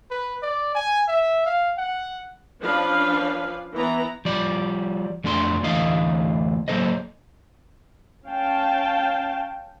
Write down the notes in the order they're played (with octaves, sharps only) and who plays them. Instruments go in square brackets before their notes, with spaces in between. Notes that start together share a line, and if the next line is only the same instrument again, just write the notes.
[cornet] B4
D5
G#5
E5
F5
F#5
[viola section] F3 C#4 D4 B4 F5
E3 B3 B4 A#5
[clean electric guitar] F3 G3 D5
F2 A3 D4 F#4 C6
D2 E3 A3 D#5 F5
F#3 A3 A#3 A4 C5 D#5
[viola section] C#4 F5 G5 A5